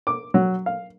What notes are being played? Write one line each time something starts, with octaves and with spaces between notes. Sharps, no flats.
D6
F#3
F5